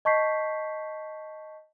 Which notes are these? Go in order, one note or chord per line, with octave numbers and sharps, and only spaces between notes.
D#5 A5 C#6 G6 B6 C7